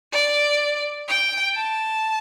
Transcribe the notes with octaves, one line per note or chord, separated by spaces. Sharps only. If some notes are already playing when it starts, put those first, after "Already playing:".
D5
G5
A5